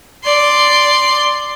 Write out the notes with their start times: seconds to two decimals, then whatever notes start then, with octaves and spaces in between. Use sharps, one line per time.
0.24 D5 C6